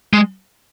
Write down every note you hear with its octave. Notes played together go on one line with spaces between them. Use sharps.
G#3